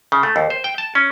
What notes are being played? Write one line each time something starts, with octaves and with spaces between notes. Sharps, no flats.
C#3
A3
D#2
C5
G5
A5
C#4